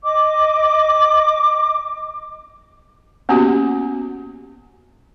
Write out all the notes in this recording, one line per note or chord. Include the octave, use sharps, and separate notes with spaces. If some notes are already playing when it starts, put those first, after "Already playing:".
D#5 D6
A#3 B3 C#4 F#4 G4